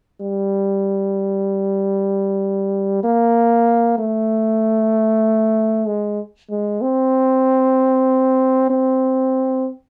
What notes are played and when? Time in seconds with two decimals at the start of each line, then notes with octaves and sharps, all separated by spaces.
0.20 G3
3.04 A#3
3.98 A3
5.87 G#3
6.50 G#3
6.82 C4
8.70 C4